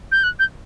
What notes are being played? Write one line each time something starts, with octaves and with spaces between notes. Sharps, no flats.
G6
F#6
G6